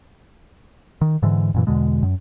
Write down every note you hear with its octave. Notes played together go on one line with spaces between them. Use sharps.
D#3
G#2 D3 E3
F#2 A#2 E3
E2 B2 D3 G#3
F#2